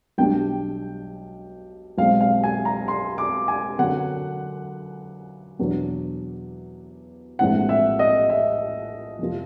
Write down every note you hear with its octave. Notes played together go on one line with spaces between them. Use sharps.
B1 B2 G3 B3 D4 G5
B1 B2 G#3 C4 F5
F5
G#5
A#5
C6
D6
G#5
F#2 D3 F#3 B3 D4 F#5
E2 B2 F#3 B3 D4
A#1 A2 E3 G#3 C4 F#5
E5
D#5
E5
F2 C3 F3